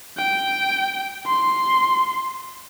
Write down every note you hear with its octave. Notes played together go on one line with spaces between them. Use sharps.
G5
C6